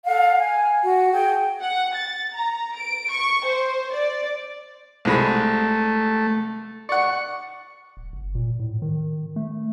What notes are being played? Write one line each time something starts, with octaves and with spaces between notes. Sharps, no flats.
A4 F5 F#5
G#5
F#4
G#4 G5
F#5
A6
A#5
D7
C#6
C5
D5
C2 G#3 A3 B5
D5 F#5 C#6
D1
F#1
A#2
A2
D#3
A3